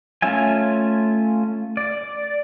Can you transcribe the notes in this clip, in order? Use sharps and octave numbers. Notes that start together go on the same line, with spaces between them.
A3 C#4 F4 E5 G#5
D5